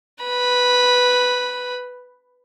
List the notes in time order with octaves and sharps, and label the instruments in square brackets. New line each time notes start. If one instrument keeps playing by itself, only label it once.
[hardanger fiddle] B4 B5